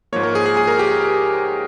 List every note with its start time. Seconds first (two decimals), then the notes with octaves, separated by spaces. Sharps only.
0.13 G#2 F3 A#3 C#5
0.23 A#4
0.35 G#4
0.46 G#4
0.57 G#4
0.67 A#4
0.79 G4